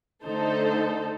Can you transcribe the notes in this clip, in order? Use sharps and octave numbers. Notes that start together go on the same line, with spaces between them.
D3 A3 D#4 A4 C5